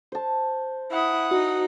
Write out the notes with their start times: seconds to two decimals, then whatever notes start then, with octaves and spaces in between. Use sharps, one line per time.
0.12 C5 A5
0.91 E4 F#5 D#6
1.31 D#4 F#4